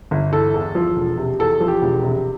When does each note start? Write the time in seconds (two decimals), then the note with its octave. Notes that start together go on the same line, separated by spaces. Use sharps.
0.11 G1
0.32 E3 A4
0.54 E2
0.75 F3
0.96 E1
1.17 C3
1.39 E2 A4
1.60 F3
1.68 G4
1.82 E1
2.03 C3